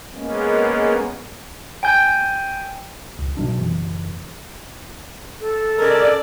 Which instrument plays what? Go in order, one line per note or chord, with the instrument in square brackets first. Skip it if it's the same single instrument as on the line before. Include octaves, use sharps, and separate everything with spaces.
[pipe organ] G#3 A#3 B3 C#4
[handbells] G5 G#5 G6
[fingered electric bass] C#2
B2 F#3 D4
F#1 F#2 E3
[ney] A4
[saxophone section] C#3 G#3 A#4 [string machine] D5